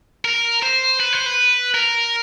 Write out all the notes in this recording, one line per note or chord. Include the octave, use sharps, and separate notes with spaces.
A#4
C5
B4
C5
B4
A#4